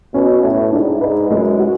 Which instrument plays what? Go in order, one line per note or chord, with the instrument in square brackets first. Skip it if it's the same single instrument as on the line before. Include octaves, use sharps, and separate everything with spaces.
[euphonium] B2 [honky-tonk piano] C#4
[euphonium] A2 [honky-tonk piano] C#5
[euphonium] G#2 [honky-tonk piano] D4
[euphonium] G#2 [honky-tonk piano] B4
[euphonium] F#2 [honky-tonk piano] G#3
[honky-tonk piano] F#4